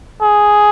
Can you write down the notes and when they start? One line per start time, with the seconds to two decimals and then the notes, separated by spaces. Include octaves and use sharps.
0.22 G#4